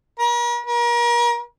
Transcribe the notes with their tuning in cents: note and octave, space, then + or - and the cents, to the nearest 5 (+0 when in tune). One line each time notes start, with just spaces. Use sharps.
A#4 +45
A#4 +35